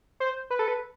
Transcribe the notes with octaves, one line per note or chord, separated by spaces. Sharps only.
C5
B4
A4
B4